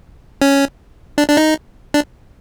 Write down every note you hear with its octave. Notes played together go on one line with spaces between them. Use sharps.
C#4
D4
D4
D#4
D4